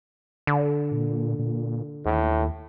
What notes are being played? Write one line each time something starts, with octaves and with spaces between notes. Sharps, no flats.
D3
A#2
A#2
D#2 A2